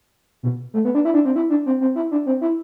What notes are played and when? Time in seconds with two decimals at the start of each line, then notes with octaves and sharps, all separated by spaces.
0.43 B2
0.74 A3
0.85 B3
0.95 D4
1.05 E4
1.14 D4
1.25 C4
1.36 E4
1.50 D4
1.66 C4
1.81 C4
1.96 E4
2.12 D4
2.26 C4
2.41 E4